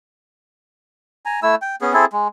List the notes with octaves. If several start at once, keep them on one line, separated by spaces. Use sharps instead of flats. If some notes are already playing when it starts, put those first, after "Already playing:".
G#5 A#5
A3 E4 E6
G5
B3 C#4 G#4
C4 E4 G#4 A4
G#3